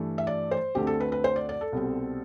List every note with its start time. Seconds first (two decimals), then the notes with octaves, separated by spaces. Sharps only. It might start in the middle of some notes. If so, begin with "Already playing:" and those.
Already playing: G2 E3 A3
0.18 E5
0.27 D5
0.51 C5
0.75 D2 D3 A3 C4 G4
0.87 A4
1.00 B4
1.12 B4
1.24 C5
1.36 D5
1.49 D5
1.61 A4
1.72 C2 B2 G3 C4